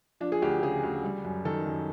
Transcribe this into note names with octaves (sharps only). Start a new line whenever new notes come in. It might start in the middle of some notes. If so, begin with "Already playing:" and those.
F3 D4
G#4
D2 G4
C#3 G#4
D2
G3
F#2
D#3 A4
F#2